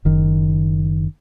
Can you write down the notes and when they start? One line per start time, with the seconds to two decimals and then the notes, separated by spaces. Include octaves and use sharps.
0.05 F#1 D#3